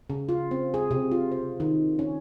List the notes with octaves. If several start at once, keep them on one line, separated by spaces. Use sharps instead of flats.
C#3
F4
C4
G#4
C3
F4
C5
D#3
C#4